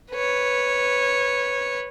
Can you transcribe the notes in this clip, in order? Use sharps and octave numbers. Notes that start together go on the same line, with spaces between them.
B4 C#5